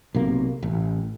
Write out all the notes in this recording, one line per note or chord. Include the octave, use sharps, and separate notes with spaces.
B1 C3 A#3
A1